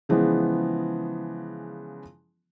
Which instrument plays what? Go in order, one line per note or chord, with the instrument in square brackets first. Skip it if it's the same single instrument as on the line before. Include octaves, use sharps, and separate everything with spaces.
[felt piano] C#3 E3 F3 G#3 B3